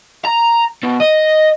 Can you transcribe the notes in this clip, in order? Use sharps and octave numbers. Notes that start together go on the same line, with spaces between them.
A#5
B2
D#5